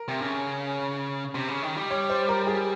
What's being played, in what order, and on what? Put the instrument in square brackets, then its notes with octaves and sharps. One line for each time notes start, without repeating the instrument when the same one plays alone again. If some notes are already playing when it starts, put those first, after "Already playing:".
Already playing: [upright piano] A#4
[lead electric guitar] C3
C#3
C3
C#3
D#3
G3
[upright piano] C#5
C5
A#4
G#4